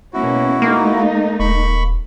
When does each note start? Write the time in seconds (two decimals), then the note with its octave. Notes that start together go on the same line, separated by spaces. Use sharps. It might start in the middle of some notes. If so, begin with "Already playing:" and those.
0.14 B2 A#3 C#4 E4 F#4
0.62 A3 A#3 D#4
1.40 D#1 B5 C#6